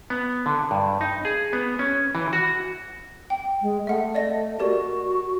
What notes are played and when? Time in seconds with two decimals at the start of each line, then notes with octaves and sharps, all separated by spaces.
0.10 B3
0.46 D3
0.71 G2
1.01 D#4
1.25 G#4
1.53 B3
1.79 C#4
2.15 E3
2.33 F#4
3.30 G5
3.62 G#3
3.87 A3 E5 F#5
4.15 D5 D#5 A#6
4.60 F#4 G4 A#4 D5